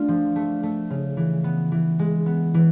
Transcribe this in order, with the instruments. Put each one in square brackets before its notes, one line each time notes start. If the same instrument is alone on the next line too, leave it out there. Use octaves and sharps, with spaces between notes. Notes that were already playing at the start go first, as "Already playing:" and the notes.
Already playing: [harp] A3 D4 F4
F3
A3
A3
C#3
E3
B3
E3
G#3
B3
E3